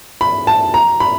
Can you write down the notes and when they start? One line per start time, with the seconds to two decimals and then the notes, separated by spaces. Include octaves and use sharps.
0.21 B5
0.47 A5
0.74 A#5
1.00 B5